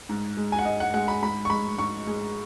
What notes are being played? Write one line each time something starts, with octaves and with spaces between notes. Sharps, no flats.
G#2
G#3
G#5
F#5
G#2 D#5
F#5
G#3 F#5
B5
G#2 B5
C#6
G#3 B5
G#2 C#6
G#3